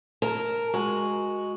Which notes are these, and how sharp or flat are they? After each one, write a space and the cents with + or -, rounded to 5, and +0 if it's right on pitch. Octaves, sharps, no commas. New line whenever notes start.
A#4 +0 A5 -10
G#3 +0 F#4 +0